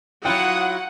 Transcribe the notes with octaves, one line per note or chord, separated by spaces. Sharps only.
F#3 E4 F4 F#5 G5 D#6